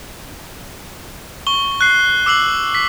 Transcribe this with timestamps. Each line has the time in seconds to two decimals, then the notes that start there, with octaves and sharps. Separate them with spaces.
1.47 C#6 G7
1.81 F#6 C7
2.26 D6 E6 C7 F#7
2.75 B6